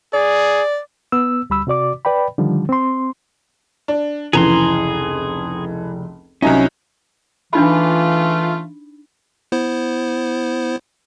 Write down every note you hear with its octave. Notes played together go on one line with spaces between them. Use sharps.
G#4 D5
B3 E6
D2 G3 B5 E6
C3 F#4 D5 D6
B4 D5 G5 B5
D3 D#3 F3 G3
C4 C6
D4
F1 C#2 E3 G#4 A#5 C6
C2 F#3 C#4 D#4 E5 G#5
C#3 E3 A3 D4 D#4 F4 B5
B3 E4 C5